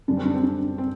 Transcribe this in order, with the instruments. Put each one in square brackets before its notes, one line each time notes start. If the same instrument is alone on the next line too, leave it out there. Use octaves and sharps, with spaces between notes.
[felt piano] F#2 D3 G3 D4
C4
D4
C4
D4
C4